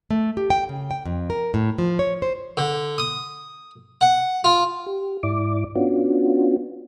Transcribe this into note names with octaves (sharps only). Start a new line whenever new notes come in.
A3
G4
G5
C#3
G5
F2
A#4
A2
F3
C#5
C5
D3
D#6
F#5
F4
G4
G#2 E4 D5 D6
B3 C#4 D4 F4 F#4